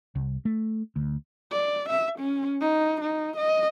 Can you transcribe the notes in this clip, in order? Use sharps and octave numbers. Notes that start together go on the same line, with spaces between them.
C2
A3
D2
D5
E5
C#4
D#4
D#4
D#5